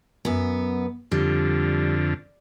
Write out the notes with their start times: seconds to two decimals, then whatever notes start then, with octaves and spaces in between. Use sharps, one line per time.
0.25 F#2 B3
1.12 F2 D3 G3